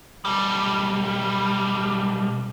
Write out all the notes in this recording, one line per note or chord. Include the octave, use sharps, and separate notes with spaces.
B1 G3